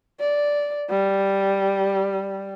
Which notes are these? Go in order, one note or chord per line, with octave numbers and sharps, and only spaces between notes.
D5
G3